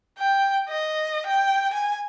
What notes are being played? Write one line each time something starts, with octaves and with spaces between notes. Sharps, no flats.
G5
D#5
G5
G#5